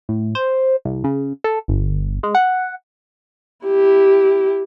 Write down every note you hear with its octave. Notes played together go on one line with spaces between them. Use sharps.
A2
C5
C2
C#3
A4
G1
G#3
F#5
E4 G4